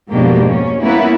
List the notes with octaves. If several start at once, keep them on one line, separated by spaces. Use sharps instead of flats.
F2 G#2 B2 A#3 D4 G4
C#4
A#3 B3 C#4 E4 B4